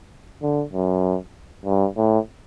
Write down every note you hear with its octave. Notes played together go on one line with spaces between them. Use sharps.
D3
F#2
G2
A2